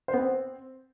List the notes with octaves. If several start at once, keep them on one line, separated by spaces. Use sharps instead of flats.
C5
B3
C4